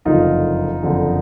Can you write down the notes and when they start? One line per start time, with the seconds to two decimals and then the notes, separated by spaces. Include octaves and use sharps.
0.05 F#1 F2 D3 D#4 F4
0.83 F#1 F2 D3